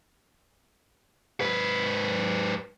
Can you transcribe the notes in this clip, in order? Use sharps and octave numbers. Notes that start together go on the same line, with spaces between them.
G#2 B4